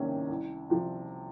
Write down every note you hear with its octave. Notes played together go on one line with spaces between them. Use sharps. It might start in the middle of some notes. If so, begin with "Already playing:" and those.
Already playing: C2 C3 D#3 A#3 C#4
C2
C3 F3